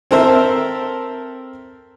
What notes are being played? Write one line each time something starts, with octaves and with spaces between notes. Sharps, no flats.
C4 A4 A#4 C5 E5